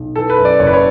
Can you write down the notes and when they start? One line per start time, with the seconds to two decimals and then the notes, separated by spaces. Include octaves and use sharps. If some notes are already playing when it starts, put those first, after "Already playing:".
Already playing: B1
0.16 E3 A4
0.30 B4
0.37 F#2
0.45 D5
0.59 F#1 C#5
0.67 B4
0.73 C#5